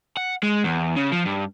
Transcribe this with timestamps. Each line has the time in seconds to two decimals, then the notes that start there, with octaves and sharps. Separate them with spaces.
0.17 F#5
0.43 G#3
0.64 E2
0.96 C#3
1.12 F3
1.26 G2